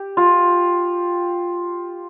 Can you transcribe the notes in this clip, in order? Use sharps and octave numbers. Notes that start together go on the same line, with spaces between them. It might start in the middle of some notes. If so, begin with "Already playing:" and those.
Already playing: G4
F4